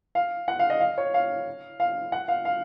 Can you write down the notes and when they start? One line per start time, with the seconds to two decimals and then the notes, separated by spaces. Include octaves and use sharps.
0.15 F5
0.48 F#5
0.59 F5
0.70 D#5
0.81 F5
0.98 C#5
1.14 F5
1.80 F5
2.12 F#5
2.28 F5
2.45 F5